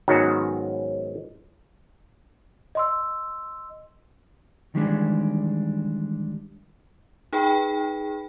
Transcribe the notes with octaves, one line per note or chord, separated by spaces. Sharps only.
G#2 D#3 F#3 B3 C#4 F#4
D#5 C6 E6
D#3 E3 G3 G#3 D4
D#4 G#4 B4 G5 B5